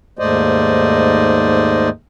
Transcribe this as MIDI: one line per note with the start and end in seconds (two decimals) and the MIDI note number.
0.19 1.89 39
0.19 1.89 44
0.19 1.89 57
0.19 1.89 72
0.19 1.89 74
0.19 1.89 75